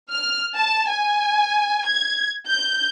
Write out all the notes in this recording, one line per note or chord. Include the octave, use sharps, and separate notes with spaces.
F6
A5
G#5
G#6
G6